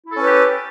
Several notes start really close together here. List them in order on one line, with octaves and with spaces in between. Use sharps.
E4 A4 C#4 B4 G4